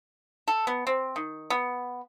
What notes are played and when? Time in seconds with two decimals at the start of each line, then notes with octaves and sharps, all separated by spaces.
0.48 A4
0.67 B3
0.87 C4
1.16 D#3
1.50 B3